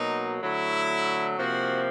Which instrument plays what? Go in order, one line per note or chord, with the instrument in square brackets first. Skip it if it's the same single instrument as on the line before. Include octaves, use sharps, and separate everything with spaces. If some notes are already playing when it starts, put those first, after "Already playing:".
Already playing: [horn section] B2 F#3 A#3 D#4
D3 F#3 A3 E4
C3 F3 A#3 F#4